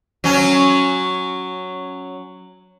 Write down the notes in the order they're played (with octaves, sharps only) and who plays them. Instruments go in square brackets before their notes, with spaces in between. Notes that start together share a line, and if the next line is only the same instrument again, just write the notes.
[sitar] F#3 C#4